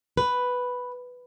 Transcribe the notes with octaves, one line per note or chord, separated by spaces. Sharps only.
B4